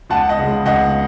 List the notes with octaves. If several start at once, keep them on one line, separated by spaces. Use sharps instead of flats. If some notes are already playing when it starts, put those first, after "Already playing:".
C#2 F#5 A5
D#5 F#5
C#3 G#3
C#2 D#5 F#5